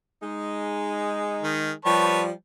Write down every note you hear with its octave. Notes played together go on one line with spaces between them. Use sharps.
G#3 D#4
D#3
F3 G3 B4 C#5 A5